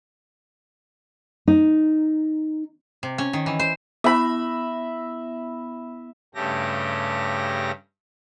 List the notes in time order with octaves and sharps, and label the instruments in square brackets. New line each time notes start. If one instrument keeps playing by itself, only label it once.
[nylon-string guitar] D#4
[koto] C3
C#4
D#3
E3
C5
[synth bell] B3 E4 A#6 [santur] E5 B5
[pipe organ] G2 C#3 A3 G4 A#6